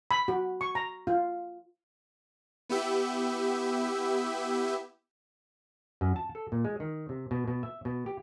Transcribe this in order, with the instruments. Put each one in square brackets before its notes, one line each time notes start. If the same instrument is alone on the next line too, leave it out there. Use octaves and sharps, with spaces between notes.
[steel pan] B5
F#4
C#6
A#5
F4
[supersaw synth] B3 E4 G4 E5
[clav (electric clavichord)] F#2
A5
A4
A#2
G#3
D#3
C3
B2
B2
E5
B2
G4